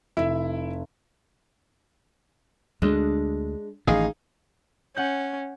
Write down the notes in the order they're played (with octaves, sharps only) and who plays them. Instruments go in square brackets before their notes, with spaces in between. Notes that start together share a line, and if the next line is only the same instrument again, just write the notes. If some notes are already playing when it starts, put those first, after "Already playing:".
[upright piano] F1 [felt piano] E4 E5
[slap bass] D2 [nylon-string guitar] G#3 D4
[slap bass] A1 D#3 [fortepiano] D#4 G#4 F5
[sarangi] C#4 [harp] F#5 G6